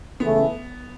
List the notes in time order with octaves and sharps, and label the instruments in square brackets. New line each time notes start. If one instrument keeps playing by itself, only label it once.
[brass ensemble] C#3 E3 A3 [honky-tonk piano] B3